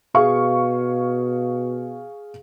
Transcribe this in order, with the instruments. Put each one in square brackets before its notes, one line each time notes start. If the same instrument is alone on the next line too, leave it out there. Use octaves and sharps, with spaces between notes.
[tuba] B2 [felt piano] G#4 F5 C#6